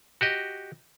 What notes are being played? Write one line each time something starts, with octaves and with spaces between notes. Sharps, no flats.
F#4 G4 D#5